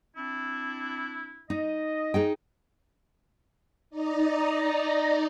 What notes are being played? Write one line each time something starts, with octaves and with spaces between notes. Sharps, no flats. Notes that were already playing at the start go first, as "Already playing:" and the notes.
C4 D4 E4
D#4 D#5
D#4 G#4 G5
D#4 D5 D#5 A#5